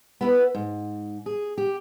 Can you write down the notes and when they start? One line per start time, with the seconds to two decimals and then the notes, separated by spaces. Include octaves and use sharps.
0.21 B3 E4 B4
0.55 G#2
1.26 G#4
1.58 G4